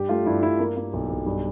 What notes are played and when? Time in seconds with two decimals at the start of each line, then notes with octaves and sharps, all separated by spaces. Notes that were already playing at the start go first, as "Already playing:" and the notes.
Already playing: G2 G4
0.09 A3 F4
0.26 G2 E4
0.42 G2 E4
0.59 A#3
0.76 A#3
0.93 B1
1.10 B1
1.26 G2